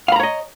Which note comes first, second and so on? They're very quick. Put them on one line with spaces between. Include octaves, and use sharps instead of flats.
F5 B5 A#5 C#5 D#5